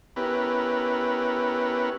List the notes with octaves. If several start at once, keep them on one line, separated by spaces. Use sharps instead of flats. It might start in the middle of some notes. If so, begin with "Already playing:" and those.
B3 C#4 E4 G4 A#4 B4